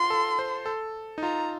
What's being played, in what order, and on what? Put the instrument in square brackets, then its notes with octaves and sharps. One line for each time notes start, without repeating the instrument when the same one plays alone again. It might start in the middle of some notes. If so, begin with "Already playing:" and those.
Already playing: [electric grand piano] F4 [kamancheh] C6
[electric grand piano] A4
C5
A4
D#4
[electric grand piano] F4 [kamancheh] A#5